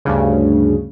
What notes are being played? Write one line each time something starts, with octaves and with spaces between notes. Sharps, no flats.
D2 G2 C#3